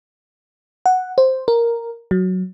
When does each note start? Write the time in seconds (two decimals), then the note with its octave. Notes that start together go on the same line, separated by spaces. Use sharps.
0.86 F#5
1.18 C5
1.48 A#4
2.11 F#3